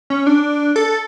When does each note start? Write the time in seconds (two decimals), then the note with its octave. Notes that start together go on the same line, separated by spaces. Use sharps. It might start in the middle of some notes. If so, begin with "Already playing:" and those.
0.10 C#4
0.27 D4
0.76 A4